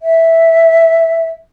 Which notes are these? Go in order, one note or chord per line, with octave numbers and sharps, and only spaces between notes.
E5